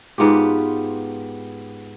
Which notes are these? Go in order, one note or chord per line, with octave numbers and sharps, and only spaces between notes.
G#2 B3 F4 G4